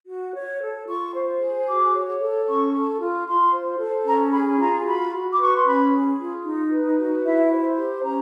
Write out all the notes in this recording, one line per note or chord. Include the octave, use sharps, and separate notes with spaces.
F#4
C#5
A4
F4 C#6
C5
G#4
F#4 D6
C#5
A4
C#4 C#6
A4
F4
F4 C6
C5
A4
C#4 A#5
G#4 B5
F4 A#5
F#4 B5
F#4
D6
B4 C#6
C6
C#4 B5
G#4
F4
D#4
B4
F#4
E4 E5
C5
G4
C#4 A#5